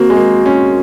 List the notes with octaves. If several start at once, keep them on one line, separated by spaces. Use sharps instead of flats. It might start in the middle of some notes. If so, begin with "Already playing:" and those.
Already playing: A#3 C4 F#4
G#3
A#3
C#4